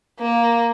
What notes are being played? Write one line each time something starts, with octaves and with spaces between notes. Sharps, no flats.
A#3